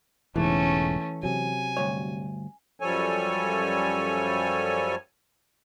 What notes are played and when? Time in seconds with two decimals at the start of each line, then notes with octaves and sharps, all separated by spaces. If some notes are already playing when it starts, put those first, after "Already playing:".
0.36 E1 G#2 C#3 E3 A3 C#4
1.23 C3 F#3 G#5
1.77 D2 G2 C#5
2.80 F#2 F3 G3 A4 C#5 G#5